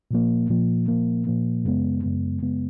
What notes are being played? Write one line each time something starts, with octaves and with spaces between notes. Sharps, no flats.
A#2 F3 A#3
A#2 F3 A#3
A#2 F3 A#3
A#2 F3 A#3
F#2 C#3 G#3 B3
F#2 C#3 G#3 B3
F#2 C#3 G#3 B3